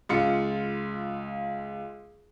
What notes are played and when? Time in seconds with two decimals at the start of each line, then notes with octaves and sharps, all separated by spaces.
0.09 C#2 F4 C#7